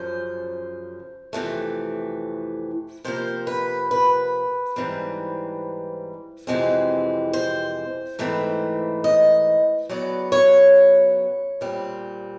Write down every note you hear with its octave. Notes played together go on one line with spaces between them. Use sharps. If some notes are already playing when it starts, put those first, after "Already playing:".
Already playing: F#2 C#3 F3 C5
F2 C3 E3 A3
C3 F3 A#3 C5
B4
B4
G#2 E3 G3 C4
F2 C3 E3 G#3 C4
C5
G#2 E3 A3 C4
D#5
C#3 F#3 B3 D5
C#5
A#2 G3 C4